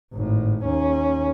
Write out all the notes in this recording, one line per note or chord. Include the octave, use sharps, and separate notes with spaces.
G#1 A2
D#2 C#4